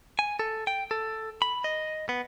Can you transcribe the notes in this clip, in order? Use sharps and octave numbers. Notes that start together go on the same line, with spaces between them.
G#5
A4
G5
A4
B5
D#5
B3